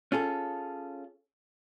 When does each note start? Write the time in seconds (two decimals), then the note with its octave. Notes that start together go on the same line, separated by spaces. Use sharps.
0.12 C#4 F4 G#4 A4